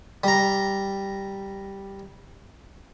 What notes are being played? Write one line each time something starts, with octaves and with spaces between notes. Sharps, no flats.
G3 A#5